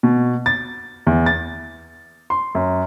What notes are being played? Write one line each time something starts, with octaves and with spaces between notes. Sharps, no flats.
B2
A6
E2
A6
C6
F#2